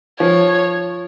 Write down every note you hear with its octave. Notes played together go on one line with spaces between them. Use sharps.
F3 C#5